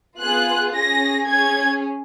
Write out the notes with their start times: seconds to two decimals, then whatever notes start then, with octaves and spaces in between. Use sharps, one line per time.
0.20 B3 F4 G#4 F#6
0.75 C#4 G#4 A#6
1.28 C#4 G#4 G#6